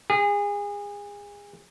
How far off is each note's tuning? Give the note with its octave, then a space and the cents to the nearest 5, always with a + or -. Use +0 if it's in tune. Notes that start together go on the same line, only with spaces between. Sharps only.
G#4 -30